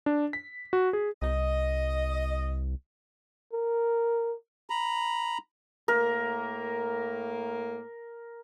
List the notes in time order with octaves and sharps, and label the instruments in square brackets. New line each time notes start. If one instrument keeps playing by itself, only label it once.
[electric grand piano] D4
B6
F#4
G#4
[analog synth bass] C2 [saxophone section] D#5
[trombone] A#4
[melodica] A#5 B5
[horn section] A2 A#3 [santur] A#4